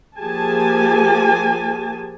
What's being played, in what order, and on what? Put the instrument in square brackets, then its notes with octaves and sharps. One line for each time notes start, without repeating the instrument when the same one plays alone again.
[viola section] F3 A#3 G4 G#4 G#5 A5